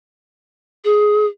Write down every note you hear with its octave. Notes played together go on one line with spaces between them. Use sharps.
G#4